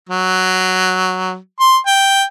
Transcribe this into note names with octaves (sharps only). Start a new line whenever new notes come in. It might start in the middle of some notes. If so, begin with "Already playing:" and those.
F#3
C6
G5